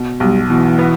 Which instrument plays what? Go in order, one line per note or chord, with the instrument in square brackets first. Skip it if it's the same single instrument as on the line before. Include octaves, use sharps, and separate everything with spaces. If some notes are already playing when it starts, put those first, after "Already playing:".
Already playing: [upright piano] B2
[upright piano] B1 [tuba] G3
[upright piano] B2 [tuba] E3
[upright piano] B3